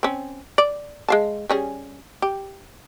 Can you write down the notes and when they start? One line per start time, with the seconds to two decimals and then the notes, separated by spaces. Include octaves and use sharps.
0.03 C4 C#4
0.58 D5
1.08 G#3 F5 A5
1.49 G3 C#4 G#4
2.22 G4